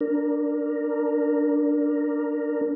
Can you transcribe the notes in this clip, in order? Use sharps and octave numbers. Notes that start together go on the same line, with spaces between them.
D4 A#4